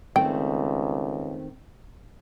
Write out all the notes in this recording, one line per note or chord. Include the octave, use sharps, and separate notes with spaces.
C#2 D#3 A3 C4 G5